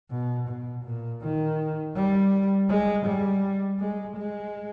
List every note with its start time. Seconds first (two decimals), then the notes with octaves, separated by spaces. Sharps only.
0.11 B2
0.48 B2
0.84 A#2
1.22 D#3
1.95 G3
2.69 G#3
3.06 G3
3.80 G#3
4.16 G#3